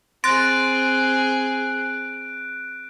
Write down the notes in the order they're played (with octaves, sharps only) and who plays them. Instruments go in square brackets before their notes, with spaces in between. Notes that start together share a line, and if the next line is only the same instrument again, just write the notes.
[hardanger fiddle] C4 G#4 [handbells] C6 A6 A#6 [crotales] F#6 D7